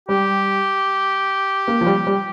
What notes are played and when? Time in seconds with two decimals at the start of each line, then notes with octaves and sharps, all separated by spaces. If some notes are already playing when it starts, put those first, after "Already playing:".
0.08 G3 G4
1.68 A#3
1.81 F3
1.86 G3
2.07 G3